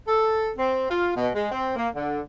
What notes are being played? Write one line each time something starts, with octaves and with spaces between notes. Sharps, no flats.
A4
C4
F4
B2
G#3
C4
A#3
D3